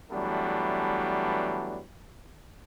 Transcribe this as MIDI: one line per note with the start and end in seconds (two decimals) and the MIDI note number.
0.11 1.81 52
0.11 1.81 54
0.11 1.81 55
0.11 1.81 57
0.11 1.81 59
0.11 1.81 62